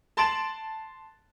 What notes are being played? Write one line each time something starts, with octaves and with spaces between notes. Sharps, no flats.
A5 C6 A6 D7 E7 F#7